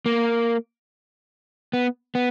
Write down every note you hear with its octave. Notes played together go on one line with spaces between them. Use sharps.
A#3
B3
B3